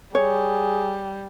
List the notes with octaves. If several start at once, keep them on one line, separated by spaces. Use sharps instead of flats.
G3 G#4 C#5